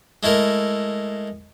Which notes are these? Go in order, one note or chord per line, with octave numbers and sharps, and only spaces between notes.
G#3 A3 E4 A#4